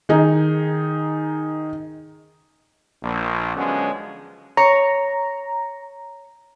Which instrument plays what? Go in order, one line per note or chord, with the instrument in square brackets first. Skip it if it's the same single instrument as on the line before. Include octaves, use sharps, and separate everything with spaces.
[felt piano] D#3 D#4 G#4
[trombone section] A#1
D3 F3 F#3 G#3 B3 C#4
[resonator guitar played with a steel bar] C#5 [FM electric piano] A#5